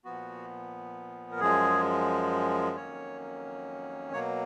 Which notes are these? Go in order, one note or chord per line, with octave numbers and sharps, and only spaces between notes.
A#2 F3 B3 F#4
A#4
F#2 F3 G#3 G#4
F2 D#3 F#3 A#3 C#4 C#5
B2 F#3 A#3 C#5